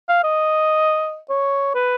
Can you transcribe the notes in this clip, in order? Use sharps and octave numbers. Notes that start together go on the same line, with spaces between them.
F5
D#5
C#5
B4